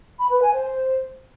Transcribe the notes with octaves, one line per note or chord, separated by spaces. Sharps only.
B5
B4
G#5
C5